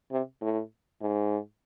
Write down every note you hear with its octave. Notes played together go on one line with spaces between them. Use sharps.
C3
A2
G#2